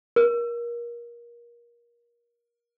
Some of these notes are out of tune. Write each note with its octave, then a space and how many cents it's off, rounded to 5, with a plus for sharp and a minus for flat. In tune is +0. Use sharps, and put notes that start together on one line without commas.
A#4 +25